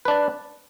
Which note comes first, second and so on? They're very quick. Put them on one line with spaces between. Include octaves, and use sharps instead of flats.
B4 D4 D5